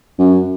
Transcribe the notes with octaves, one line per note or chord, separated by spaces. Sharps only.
F#2